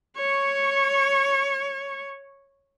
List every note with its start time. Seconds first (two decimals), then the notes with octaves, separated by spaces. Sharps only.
0.16 C#5 C#6